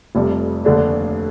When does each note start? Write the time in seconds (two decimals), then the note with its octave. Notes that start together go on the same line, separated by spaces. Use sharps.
0.15 F1 F2 C3 G3
0.65 F1 D#2 D3 A3 D4